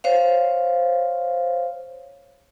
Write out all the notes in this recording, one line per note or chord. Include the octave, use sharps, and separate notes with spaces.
C5 C#5 F5